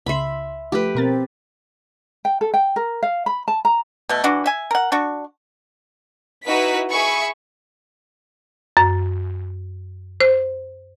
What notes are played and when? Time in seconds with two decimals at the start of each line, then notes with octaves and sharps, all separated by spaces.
0.06 C#2 C#3 E5 B5 C6
0.72 F3 A3 G4 A4 B4
0.95 B2 C4 A#4 A6
2.25 G5
2.41 A4
2.54 G5
2.76 A#4
3.03 F5
3.26 B5
3.48 A5
3.65 A#5
4.09 B2 A3
4.24 E3 D4 F#4
4.46 E5 G#5
4.71 A#4 F#5
4.92 D4 F#4 C#6
6.46 D#4 E4 F#4 B4 B6
6.89 G#4 E5 B5 C#6
8.77 F#2
10.20 C5